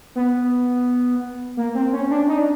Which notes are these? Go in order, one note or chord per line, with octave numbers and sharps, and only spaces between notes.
B3
A#3
C4
C#4
D4
D#4
D4